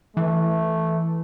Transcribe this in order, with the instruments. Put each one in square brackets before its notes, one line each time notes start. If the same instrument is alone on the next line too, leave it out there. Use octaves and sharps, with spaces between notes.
[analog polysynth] E3 [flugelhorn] A3